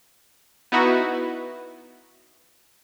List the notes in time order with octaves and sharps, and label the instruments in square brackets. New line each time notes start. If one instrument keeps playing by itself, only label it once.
[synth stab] B3 D#4 E4 F#4 B4